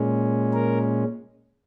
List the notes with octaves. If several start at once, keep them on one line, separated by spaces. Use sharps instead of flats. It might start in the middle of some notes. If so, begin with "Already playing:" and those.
Already playing: A#2 G#3 C#4
A#4